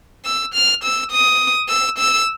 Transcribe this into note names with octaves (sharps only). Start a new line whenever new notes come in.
E6
F6
E6
D#6
E6
E6